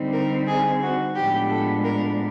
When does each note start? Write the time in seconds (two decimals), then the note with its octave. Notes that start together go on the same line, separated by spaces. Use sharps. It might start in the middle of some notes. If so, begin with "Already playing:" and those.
Already playing: D3 G3 C4 D#4
0.13 A#4
0.47 G#4
0.81 F#4
1.16 A2 F3 G#3 B3 D4 G4
1.49 A4
1.84 A#4